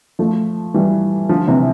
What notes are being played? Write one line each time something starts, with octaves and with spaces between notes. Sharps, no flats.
F3 A3
E3 G3
D3 F3
C3 E3